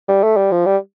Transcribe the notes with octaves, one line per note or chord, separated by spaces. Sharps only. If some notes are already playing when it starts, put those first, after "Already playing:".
G3
A3
G3
F3
G3